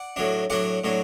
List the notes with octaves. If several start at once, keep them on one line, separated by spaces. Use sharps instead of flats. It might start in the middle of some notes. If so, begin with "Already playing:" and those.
Already playing: D5 F#5
A2 F#3 D4
A2 F#3 D4 D5 F#5
A2 F#3 D4